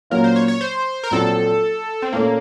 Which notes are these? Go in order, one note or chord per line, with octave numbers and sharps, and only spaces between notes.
A#2 F#3 A#3 C#4 F4 A#4
C5
C#5
C#5
C5
A#4
A#1 A#2 F#3 C4 A4
C4
A#2 A3 A#3 C#4 F4